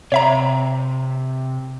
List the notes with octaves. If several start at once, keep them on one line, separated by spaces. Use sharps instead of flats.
C3 C#5 E5 A#5